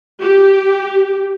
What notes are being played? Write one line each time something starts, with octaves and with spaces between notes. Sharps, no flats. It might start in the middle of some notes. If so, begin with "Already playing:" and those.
G4